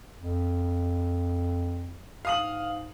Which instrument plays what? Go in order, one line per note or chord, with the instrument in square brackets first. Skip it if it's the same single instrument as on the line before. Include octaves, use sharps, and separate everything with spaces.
[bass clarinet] F2
[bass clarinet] G#2 [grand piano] F5 D#6 F#7